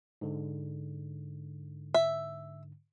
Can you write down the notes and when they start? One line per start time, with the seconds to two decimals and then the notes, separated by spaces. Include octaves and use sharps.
0.21 G#2 D3
1.94 E5